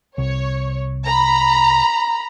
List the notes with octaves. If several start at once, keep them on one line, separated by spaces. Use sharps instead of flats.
C2 C#5
A#5 B5